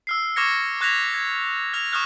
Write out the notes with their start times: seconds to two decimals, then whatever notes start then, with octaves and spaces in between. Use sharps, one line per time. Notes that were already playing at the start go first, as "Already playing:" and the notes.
0.07 E6 F6 C7
0.36 C#6 D6 F6 G#6 A#6 C#7
0.81 C#6 F#6 G#6 A#6 B6 F7
1.14 G#6
1.73 F6 A#6 F7
1.92 C#6 D#6 F6 F#6